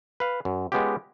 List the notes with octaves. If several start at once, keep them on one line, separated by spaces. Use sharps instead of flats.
B4 F5
F#2
G#3 B3 C#4 F4 G4